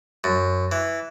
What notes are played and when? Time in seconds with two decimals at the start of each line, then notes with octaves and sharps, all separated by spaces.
0.24 F#2
0.72 E3